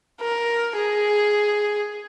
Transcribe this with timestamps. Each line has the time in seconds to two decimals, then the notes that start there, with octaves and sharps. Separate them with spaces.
0.21 A#4
0.78 G#4